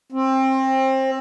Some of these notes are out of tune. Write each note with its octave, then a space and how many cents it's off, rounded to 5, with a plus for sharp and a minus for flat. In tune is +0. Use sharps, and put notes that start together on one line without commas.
C4 +25